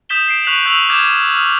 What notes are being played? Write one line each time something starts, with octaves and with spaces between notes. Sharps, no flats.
D#6 G6 B6 E7 G7
C7 D7
C#6 F#6 B6 D7 F7 F#7
C#6 E6 F#6 G6 F7 F#7
D6 F6 G6 G#6 E7
F6